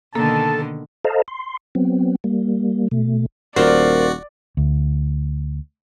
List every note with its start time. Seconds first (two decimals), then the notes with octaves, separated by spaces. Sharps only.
0.15 B2 D3 D#3 A#3 A4 A5
1.05 A4 C5 D#5 F5 A5 A#5
1.28 C6
1.75 F#3 B3 C4
2.24 G3 A#3
2.91 B2 A3
3.56 D#1 F4 F#4 A#4 C5 D5
4.57 D2